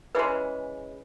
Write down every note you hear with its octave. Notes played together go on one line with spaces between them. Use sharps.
C#3 E3 G#3 B4